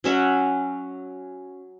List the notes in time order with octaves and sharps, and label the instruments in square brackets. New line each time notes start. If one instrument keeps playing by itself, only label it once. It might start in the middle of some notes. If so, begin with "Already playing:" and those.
[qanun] F#3 C#4 E5 F#5